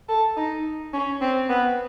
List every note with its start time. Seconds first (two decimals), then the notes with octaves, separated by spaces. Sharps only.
0.09 A4
0.37 D#4
0.93 C#4
1.21 C4
1.49 B3